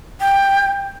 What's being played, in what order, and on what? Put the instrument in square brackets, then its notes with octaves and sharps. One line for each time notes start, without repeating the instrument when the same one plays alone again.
[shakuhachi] G5